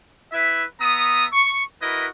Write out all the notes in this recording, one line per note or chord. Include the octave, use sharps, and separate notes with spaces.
E4 B4 E5
B3 E5 A#5 D#6
C#6
E4 F#4 A#4 B4 D#5